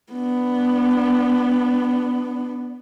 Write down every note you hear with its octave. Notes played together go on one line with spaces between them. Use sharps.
B3 D4